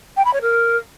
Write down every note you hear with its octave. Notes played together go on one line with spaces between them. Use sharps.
G5
B5
C#5
A#4